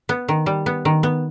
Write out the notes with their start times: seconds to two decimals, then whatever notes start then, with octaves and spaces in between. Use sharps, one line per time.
0.09 B3
0.28 D#3
0.46 G3
0.66 B3
0.85 D#3
1.03 B3